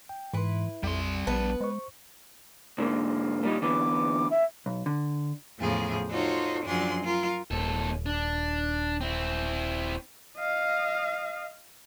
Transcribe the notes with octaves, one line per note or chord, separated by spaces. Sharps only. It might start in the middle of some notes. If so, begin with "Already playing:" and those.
G5
G#2 E3 E4 B4 C6
A#1 F2 G3 C6
A#1 B3 B4 A5
G#3 C5 C#6
G#2 D3 A#3
A#2 G3 D#4
D3 E3 B3 D6
E5
B1
D3
E2 A2 C#3 F3 G#4
D#4 F4 F#4 A4 C5 C#5
F#2 F3 F#3 D4 G#4 C6
F4 A#4
D#1 D#2 A4
D4
C4 E4
D#5 F5